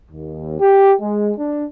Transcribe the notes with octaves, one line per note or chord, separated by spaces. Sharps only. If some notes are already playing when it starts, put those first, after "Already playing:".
D#2
G4
G#3
D4